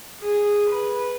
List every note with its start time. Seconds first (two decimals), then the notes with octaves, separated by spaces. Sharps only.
0.21 G#4
0.70 B4